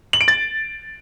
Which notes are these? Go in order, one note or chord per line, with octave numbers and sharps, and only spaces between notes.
F#7
D7
A6